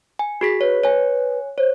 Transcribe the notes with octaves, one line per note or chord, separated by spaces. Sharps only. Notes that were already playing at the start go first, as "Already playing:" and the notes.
G#5
F#4 G#4 B6
B4 C#5
C#5 G#5
C5 C#5